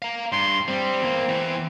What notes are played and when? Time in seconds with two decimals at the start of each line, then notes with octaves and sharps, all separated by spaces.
0.02 F5 A#5
0.32 G2 C6
0.68 G3 C4
1.02 E2 A#3
1.29 E2 E3